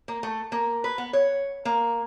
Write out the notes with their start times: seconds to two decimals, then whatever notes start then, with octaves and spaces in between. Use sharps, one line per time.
0.08 A#3
0.23 A3
0.52 A#3
0.84 B4
0.98 B3
1.13 C#5
1.65 A#3